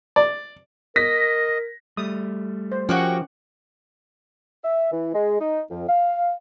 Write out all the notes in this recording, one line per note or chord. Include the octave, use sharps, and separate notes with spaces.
D5
A#4 D#5 A#6 B6
G3 A3 D#6
C5
F3 A#3 C#4 F#4 G4 F#5
E5
E3
G#3
D#4
F2
F5